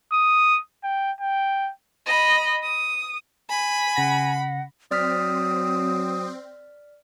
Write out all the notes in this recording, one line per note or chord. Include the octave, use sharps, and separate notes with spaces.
D#6
G5
G5
D#5 B5
D#6
G#5 B5
C#3 F#5 A#6
F#3 C4 D5 D#6 F6 B6